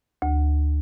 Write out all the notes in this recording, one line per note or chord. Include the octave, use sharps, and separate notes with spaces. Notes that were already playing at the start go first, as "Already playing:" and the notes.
D2